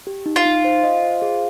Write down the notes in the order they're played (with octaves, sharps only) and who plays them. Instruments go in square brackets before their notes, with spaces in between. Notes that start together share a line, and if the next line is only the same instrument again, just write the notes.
[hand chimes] G4
D#4
[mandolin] F4
[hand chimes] D#4
C5
D#5
C5
G#4